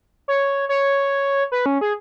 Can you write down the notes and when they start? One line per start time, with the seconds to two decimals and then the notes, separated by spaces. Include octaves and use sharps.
0.28 C#5
0.69 C#5
1.52 B4
1.66 C#4
1.81 G#4